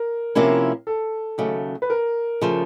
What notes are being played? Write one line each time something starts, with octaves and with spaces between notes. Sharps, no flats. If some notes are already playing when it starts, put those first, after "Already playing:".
Already playing: A#4
C3 F3 A#3 C#4 E4
A4
D#2 C#3 F#3 A3
B4
A#4
C#3 F3 A3